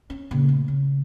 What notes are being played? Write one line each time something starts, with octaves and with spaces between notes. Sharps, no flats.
C#4
A#2 C#3
A3
C#3